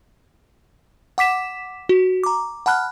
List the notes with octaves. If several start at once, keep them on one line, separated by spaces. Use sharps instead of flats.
F#5 D6 B6 E7
F#4
A#5 D6
F#5 A5 B5 F6 F#6